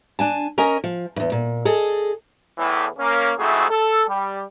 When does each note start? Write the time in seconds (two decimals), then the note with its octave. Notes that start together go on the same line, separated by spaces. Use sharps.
0.19 D4 G#5 A5
0.58 C#4 A#4 D#5 G#5
0.84 F3
1.16 E2 G2
1.32 A#2
1.65 G#4 A4 D#5
2.58 E2 A2 E3
2.99 A#3 C#4
3.38 F2 G#2 A3 E4 F#4 G#4
3.70 A4
4.08 G3